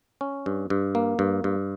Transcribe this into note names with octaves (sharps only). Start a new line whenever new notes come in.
C#4
G2
G2
A#3
G2
G2